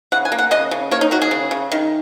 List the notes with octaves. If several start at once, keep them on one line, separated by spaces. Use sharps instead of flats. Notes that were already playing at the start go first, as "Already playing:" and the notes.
C#3 F#5
G#5
A#3
F#5
C#3 D#5
C#3
A#3 C#5
D#4
D#3 F#4
G#4
C#3
C#3
D#3